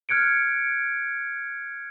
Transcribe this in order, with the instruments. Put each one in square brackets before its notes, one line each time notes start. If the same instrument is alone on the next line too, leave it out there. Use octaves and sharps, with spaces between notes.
[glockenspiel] F6 F#6 G#6 C#7 D7